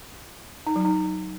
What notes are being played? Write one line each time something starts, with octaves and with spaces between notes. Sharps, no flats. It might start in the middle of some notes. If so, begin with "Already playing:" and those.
D#4
F#3
D#4